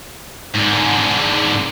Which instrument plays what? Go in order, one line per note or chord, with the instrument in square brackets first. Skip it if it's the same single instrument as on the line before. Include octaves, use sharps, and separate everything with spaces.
[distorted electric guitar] G#2 D3